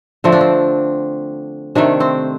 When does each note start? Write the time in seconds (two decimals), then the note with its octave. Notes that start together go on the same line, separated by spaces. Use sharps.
0.24 D3 F3 A3 C4
0.32 D4
0.41 C4
1.75 C3 D#3 A3 D4
2.00 C4